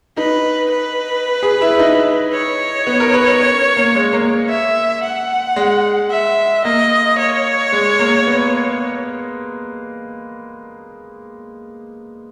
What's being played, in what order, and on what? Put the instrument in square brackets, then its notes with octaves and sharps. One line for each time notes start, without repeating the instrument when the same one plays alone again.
[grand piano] D#4 [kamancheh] B4
[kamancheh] B4
[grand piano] G#4
E4
D#4
[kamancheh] C#5
[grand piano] B3
A#4
B4
A#4
C#4
A#3
G#3
A#3
[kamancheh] E5
F#5
[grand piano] G#3
[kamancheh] E5
[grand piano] A#3 [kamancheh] D#5
[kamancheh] C#5
[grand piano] G#3
A#3
B3